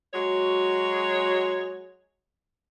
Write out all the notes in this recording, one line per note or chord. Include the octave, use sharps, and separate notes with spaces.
F#3 G#3 F#4 C#5